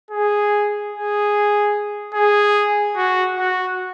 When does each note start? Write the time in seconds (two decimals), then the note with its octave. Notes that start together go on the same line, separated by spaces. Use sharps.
0.11 G#4
0.92 G#4
2.14 G#4
2.96 F#4
3.37 F#4